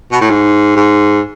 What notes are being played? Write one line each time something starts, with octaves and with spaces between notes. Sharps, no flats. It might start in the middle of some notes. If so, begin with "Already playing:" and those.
B2
A2
G#2
G#2